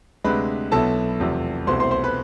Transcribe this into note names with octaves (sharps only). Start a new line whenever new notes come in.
D2 C3 G#3 D4 B4 B5
B1 B2 B3 E4 A4 A5
F1 E2 C3 F3
C2 B2 A3 C4 E4 C5 C6
C5 C6
C5 C6
B4 B5